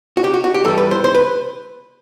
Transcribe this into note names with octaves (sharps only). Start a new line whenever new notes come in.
F#4
G4
F#4
F#4
G4
G2 E3 G3 A4
B4
C5
C5
B4